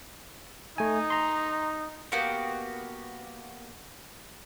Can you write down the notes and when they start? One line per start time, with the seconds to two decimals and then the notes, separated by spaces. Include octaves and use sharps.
0.78 A3 D#4 G#5
1.10 A#5 C6
2.12 A#3 B3 F#4 G4